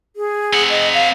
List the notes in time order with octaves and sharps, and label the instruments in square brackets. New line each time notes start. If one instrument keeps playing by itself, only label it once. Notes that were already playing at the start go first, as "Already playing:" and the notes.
[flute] G#4
[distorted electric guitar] C4 F#5
[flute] D#5
F5